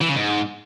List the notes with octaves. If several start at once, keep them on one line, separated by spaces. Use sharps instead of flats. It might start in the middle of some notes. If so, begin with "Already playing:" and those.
E3
C#3
G#2